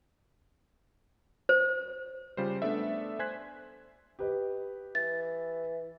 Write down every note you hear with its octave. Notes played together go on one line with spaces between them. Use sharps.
C5
C#3 G3 F4 C5
A3 B3 D4 A4 D5 E5
C5 G#5 C6 F#6 G#6 B6
G4 B4 D#5
E3 A6